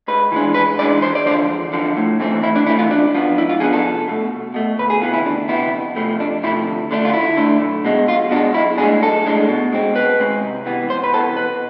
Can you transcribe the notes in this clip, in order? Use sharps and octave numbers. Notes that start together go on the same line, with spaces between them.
G#2 B4
E3 G#3 D4
G#2 B4
E3 G#3 D4 D5
E2 C5
D5
D3 F3 C5
E2
D3 F3
A2
E3 A3 C4
A2 E4
D4
E3 A3 C4 E4
F4
G#2 D4
F3 B3 D4
G#2 E4
F4
F3 B3 D4 G#4
A4
C2
B2 A3
C2
B2 A3
D2 B4
G#4
C3 E3 B3 F4
E4
D2 D4
C3 E3 B3 E4
F2
C3 F3 A3
F2 D4
C3 F3 A3 E4
D2
D3 A3 D4
F4
D2 E4
D3 A3 D4
B1
B2 G#3
B1 F4
B2 G#3 D4
B1 E4
A2 G#3 D4 G#4
B1 A4
A2 G#3 D4
B2
G#3 C4
B2 B4
G#3 C4
C2
C3 E3 B3
C2 C5
B4
C3 E3 B3 A4
B2 B4